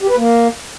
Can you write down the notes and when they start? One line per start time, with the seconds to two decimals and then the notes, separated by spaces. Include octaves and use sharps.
0.02 G4
0.09 B4
0.17 A#3